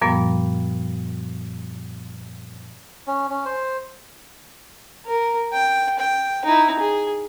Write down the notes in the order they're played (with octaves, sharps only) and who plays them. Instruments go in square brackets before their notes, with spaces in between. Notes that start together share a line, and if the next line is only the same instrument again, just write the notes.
[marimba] F#2 A#2 F3 G3 B3
[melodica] C#4
C#4
C5
[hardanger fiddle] A#4
G5
G5
D#4 E4
G#4